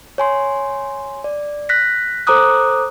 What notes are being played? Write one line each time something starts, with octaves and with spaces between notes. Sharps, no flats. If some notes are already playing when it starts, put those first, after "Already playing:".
C#5 G#5 C6
D5
F#6 A#6 B6
A4 C5 A#5 D6 D#6 F#6